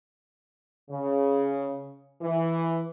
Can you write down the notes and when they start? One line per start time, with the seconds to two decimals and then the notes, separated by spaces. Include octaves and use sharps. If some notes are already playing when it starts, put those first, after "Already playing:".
0.90 C#3
2.22 E3